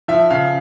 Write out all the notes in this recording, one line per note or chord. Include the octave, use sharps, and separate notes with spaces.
F3 E5
C#3 F5